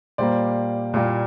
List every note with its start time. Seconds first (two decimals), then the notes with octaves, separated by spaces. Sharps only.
0.18 A#2 G3 A#3 C5 D5
0.94 A#2 G3 A#3